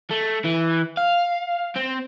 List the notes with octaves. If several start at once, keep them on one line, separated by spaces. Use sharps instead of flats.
A3
E3
F5
C4